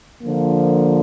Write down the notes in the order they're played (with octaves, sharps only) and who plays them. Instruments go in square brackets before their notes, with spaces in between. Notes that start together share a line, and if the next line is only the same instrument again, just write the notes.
[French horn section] D3 F3 A#3